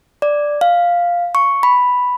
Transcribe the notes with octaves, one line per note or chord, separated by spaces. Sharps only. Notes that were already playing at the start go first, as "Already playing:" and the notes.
D5
F5
C#6
B5